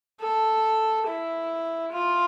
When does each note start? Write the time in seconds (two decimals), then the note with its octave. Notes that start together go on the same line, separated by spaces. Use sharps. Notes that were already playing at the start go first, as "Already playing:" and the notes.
0.21 A4
1.08 E4
1.92 F4